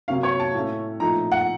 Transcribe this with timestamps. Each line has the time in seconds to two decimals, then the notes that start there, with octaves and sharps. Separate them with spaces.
0.08 C3 F#3 A#3 C#4 F5
0.23 C#5
0.40 A5
0.54 A2 A3 C#4
1.00 A#2 F3 A3 D#4 A#5
1.32 F#5